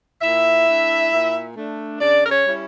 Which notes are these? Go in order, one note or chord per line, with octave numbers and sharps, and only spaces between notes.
A#2 E4 E5
A3 D4
A#2
A3 D4
C#3 D4 D5
A#4
C#4 C#5
G3 C#4 E4